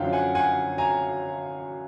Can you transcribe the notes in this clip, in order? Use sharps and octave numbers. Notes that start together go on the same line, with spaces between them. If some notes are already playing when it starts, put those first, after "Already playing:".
Already playing: F#2 D3 F3 F5 G5
F#5 G#5
F#5 G#5
G#5 A#5